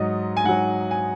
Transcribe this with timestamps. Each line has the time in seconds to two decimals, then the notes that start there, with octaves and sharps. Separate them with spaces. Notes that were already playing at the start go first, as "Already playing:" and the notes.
Already playing: G#2 F#3 D#5
0.37 G#5
0.44 G#2 F#3 F#5
0.91 G#5